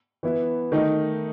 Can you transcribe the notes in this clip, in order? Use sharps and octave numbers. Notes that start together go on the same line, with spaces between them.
E3 B3 E4
D#3 A3 D#4